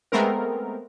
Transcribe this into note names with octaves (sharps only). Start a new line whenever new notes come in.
G#3 A3 B3 C4 A#4